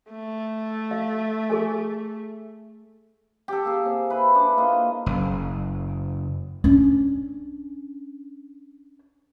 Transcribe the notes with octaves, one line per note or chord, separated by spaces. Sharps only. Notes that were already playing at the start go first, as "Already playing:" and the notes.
A3
F5
G#4 A4 G#5
G4 A4
A#3 G#4
C3
E4 B4
D4
A#3 F4 D#5
F#1
C#4 D4